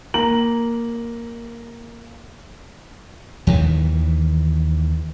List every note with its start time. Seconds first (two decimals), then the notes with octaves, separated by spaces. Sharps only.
0.14 A#3 A#5 F#7
3.47 D#2 D#3 E3